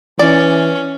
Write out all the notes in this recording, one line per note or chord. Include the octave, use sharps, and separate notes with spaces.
E3 C#4 D5